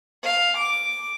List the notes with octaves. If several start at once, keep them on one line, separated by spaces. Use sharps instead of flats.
F5
D6